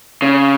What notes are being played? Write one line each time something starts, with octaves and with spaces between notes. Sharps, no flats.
C#3